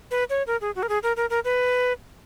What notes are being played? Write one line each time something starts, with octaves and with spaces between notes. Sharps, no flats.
B4
C#5
A#4
G#4
F#4
A#4
G#4
A#4
A#4
A#4
B4